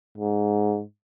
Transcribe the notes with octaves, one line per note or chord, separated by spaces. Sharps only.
G#2